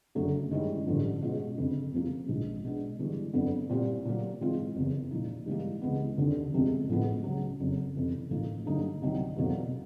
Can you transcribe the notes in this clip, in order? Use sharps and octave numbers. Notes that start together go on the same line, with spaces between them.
F#1 F#2 D3 F#3 A3
G2 D#3 G#3 C#4 E4
A1 G2 D3 F3
B2 G#3 C#4 F4
F#1 F2 D3
F2 C3 F3 A#3
A#1 G#2 F3
B2 G#3 B3 D4
G1 G2 E3 G#3
G1 F2 D3 F#3 B3
A#2 G3 C4 E4 G4
A#2 F#3 A#3
G#2 E3 G#3 C4 F4
F#1 E2 C3
A#2 F3 A#3 D#4
G#2 E3 G3 A#3
C#2 C3 E3 G#3 B3
F1 D#2 D3
G1 F2 C3 F3 G#3
A1 A2 F3 G#3 B3
C#2 C#3 F#3
F#1 F2 C#3 F#3
F1 F2 C3 E3
A1 A2 F3 A#3 D#4
G2 D3 F#3 A#3 D#4
C2 C3 D#3 F#3
F1 E2 B2 F#3 A#3